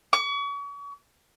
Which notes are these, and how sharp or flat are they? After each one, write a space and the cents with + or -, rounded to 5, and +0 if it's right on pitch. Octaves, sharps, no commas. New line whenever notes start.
C#6 +40